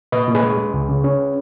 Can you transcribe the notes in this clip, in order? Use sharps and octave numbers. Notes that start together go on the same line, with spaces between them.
A#2 B4 D#5
A#2
G#4 B4
G#3
G#3
C#2
C#3
C#4